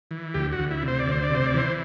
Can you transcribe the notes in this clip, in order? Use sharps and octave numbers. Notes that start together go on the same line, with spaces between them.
E3
D2 G4
F#4
D2
E4
C3
C5
D5
D2
C5
D5
C3 C5
D5
E3 C5